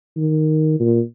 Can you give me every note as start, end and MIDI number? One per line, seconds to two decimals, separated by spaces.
0.17 0.77 51
0.80 1.00 46